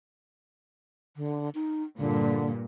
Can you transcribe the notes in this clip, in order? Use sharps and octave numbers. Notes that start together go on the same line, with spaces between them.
D3
D#4
G2 A#2 D3